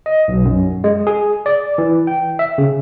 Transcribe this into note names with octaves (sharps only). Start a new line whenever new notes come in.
D#5
B1
F#2
G#3
G#4
D5
E3
G5
E5
C#3